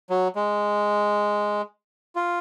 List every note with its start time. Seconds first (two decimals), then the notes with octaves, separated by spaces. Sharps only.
0.10 F#3
0.36 G#3
2.16 F4